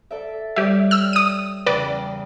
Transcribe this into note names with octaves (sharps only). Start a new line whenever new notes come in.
A4 D5 E5
G3 G4 C#5 D5 E5
E6 F6
D#6 D#7
E2 C#3 B4 D5 G5